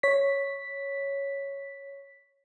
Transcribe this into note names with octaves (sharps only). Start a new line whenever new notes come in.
C#5 B6